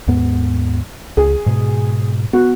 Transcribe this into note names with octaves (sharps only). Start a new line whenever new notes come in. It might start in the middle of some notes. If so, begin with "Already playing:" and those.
D#2 G#2 B3
C#2 G#4
G#2 B2
B3 F#4